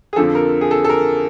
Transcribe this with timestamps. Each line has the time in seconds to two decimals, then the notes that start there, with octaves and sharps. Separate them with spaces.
0.13 G#4
0.16 F2 D3 F3 A4
0.35 A#4
0.61 G#4
0.71 A4
0.84 A4
0.89 A#4